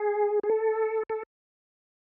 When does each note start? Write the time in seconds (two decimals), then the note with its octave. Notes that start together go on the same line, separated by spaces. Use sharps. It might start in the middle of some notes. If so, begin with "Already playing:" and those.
Already playing: G#4
0.43 G#4
0.49 A4
1.10 A4